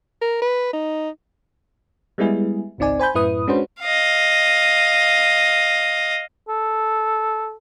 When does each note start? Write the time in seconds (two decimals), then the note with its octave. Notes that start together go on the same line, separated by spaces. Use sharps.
0.22 A#4
0.42 B4
0.73 D#4
2.18 G3 G#3 B3 E4 G#4
2.78 G#1 C#2 C4 D#4 D5 G#5
2.99 C5 G#5 B5 G6
3.15 F#2 A2 E4 B4 D#6
3.47 G#3 C#4 D4 F#4 B4 C5
3.82 D#5 F5
6.49 A4